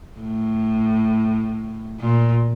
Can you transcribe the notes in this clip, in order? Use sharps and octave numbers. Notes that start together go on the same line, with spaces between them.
A2
A#2